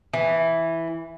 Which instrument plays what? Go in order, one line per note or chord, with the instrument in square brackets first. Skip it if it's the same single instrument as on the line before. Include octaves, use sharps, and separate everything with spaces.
[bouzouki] E3